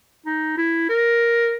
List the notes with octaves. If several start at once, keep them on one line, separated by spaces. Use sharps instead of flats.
D#4
E4
A#4